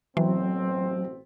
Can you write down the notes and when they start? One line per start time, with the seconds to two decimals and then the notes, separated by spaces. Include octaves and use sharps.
0.17 A1 B2 E3 F#3 C4